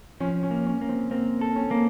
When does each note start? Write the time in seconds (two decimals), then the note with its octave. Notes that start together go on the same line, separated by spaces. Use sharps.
0.20 F3 C#4
0.43 C#4
0.51 A#3
0.66 C#4
0.81 A#3
0.89 C4
1.11 A#3 C4
1.41 A4
1.56 C#4
1.71 A#3